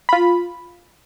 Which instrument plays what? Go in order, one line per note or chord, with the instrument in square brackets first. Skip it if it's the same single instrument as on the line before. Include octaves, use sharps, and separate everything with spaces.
[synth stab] F4 B5